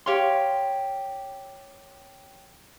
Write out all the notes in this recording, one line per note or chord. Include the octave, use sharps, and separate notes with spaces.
G4 C#5 F5 C6